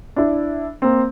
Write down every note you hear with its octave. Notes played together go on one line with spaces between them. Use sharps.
D4 E4
A#3 C4